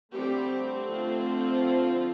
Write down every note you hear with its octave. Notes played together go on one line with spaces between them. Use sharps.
D3 G3 A3 C4 G4
F3 F4